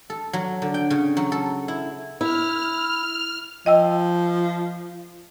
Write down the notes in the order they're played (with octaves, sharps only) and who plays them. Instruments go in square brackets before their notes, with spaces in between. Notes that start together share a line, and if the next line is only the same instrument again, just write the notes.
[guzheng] A4
F#3
D3
G5
C#3
F#3
A4
E4
[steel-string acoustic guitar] E4 [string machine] F6
[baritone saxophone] F3 [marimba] D#5 G5 E6